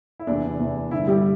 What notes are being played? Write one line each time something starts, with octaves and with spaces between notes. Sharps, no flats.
E4
E2 C3 E3 D4
E2 C3 E3
G2 D3 E4
G3 G4